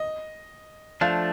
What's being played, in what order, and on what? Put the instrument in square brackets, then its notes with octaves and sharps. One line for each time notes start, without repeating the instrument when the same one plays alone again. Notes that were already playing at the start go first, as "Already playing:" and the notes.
Already playing: [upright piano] D#5
[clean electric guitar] F3 A3 D4 [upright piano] F5